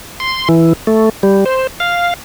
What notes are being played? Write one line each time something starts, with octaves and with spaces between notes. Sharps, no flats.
C6
E3
A3
G3
C5
F5